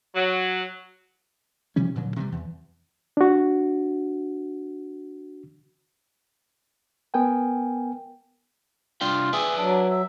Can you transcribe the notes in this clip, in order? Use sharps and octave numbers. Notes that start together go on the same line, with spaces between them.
F#3
C3 F3 G3 C#4
D2 A#2 D3 F#3
C3 E3 F#3 G3
E2
D4 F#4
B3 A#4 G5 G#5
C2 D4 F4 G5
G#4 B4 D5 E5
F#3 D4
E5